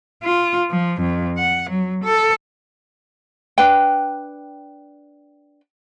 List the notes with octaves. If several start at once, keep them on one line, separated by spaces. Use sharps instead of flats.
F4
F3
F2
F#5
F#3
A4
D4 B4 G5